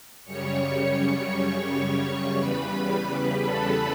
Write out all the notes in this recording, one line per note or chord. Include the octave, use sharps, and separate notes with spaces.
F#2 C#3 G3 C#5 C#6
C#5 C#6
C#5 C#6
E2 C#3 G3 B4 B5
A4 A5